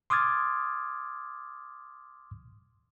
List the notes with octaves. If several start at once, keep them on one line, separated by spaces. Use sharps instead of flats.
C6 D6 D#6 F6 G#6 A6